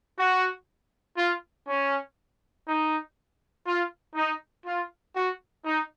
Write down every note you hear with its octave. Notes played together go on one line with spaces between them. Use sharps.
F#4
F4
C#4
D#4
F4
D#4
F4
F#4
D#4